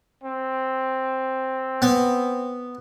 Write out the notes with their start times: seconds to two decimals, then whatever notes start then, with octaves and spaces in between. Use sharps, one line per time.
0.24 C4
1.82 B3